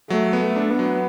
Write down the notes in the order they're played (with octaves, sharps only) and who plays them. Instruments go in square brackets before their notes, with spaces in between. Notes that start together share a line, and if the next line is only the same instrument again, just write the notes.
[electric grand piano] F#3 [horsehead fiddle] A3
[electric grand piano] B3
[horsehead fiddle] A3
[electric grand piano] D4
[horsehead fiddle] B3
[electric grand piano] F#3